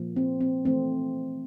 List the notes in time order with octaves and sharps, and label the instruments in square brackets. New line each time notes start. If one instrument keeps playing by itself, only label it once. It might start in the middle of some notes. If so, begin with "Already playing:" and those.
Already playing: [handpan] A#2 F3 A#3
C4
C4
E3 A3 C4